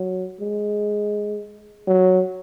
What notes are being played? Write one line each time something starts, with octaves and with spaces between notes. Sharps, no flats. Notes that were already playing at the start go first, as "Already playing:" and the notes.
Already playing: F#3
G#3
F#3